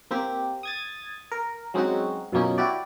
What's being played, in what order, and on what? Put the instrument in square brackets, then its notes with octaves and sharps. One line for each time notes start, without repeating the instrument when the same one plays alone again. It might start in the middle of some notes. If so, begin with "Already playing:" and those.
[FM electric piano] A#3 C4 G4
D#6 G#6 A6
A#4
F#3 G#3 C4 C#4 D#4 F#4
F#2 B2 F3 A#3 C#4 D#4
E4 F#4 G4 D5